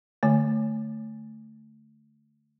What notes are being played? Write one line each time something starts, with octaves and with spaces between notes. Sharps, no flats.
D3 A3